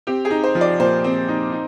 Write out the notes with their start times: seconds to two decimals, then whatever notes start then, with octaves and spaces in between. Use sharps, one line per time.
0.07 C4 G4
0.25 G#4
0.31 D#4
0.44 C5
0.55 F3
0.61 D5
0.80 A#2 C5
1.04 C4
1.28 D#4
1.52 D#4